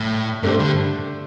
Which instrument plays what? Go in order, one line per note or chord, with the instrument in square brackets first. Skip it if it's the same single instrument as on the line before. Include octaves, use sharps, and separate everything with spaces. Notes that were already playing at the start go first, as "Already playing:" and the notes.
Already playing: [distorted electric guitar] A2 [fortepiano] G3
[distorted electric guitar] G2 [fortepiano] A3 D4 G4 C5
[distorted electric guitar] D3